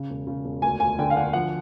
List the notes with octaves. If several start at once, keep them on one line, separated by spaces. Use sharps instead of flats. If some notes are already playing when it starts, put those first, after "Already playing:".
Already playing: C#3
E1
C#3
E1
D2 G#5
D2 G#5
D3 G5
F5
D3 F#5
F3 F#5